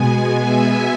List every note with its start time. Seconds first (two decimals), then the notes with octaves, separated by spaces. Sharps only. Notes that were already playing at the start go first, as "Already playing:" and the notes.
Already playing: B2 G#3 B3 G#5
0.40 E5